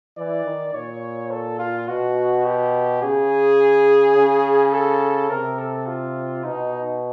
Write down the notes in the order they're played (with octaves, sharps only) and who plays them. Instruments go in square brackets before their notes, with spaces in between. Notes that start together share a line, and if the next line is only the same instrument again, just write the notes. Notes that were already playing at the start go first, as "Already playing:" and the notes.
[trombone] E3 [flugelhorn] D5
[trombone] D#3
[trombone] A#2 [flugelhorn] C#5
[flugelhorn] A4
F4
[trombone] B2 [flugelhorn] F#4
[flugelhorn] G4
[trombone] C#3 [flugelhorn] G#4
[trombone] C#3
[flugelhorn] A4
[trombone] C3 [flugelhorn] A#4
[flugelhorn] A4
F4
[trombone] B2 [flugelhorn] D#4